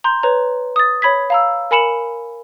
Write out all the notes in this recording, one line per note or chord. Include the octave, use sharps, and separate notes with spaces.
A#5 C6 G6
B4 C#5 A#5
D#6 A6
C#5 B5 G#6 B6
F5 A#5 E6
A#4 G#5 B5 C#7 E7 F#7